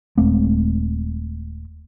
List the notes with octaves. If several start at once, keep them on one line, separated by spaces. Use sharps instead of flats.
D#1 G#3 A3 C4